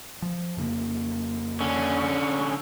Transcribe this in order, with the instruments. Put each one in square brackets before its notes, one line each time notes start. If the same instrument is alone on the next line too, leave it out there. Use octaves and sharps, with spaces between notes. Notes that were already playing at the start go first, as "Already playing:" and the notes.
[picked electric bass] F3
F2 C#3 A#3
[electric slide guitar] D3 C#4